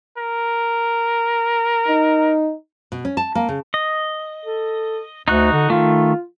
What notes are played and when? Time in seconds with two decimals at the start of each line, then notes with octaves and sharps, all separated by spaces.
0.18 A#4
1.88 D#4
2.92 B2
3.05 C#4
3.17 A5
3.35 A#3
3.49 C#3
3.74 D#5
4.45 A4
5.28 D2 D#4 F#4 F#6
5.53 D3
5.70 D#3 A3 F4